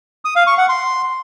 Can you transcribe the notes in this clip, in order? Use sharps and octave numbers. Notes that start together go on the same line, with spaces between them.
D#6
F5
C#6
F#5
C6